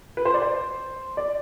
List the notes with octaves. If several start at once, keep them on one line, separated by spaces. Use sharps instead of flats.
B4
C5
D5
C5
D5